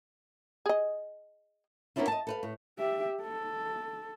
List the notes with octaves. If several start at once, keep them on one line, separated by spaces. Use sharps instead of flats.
G#4 D#5
A#3 B3 C#4 D4 E4 F4
D#5 A5
A4 B4 F5
A2
G4 E5
A4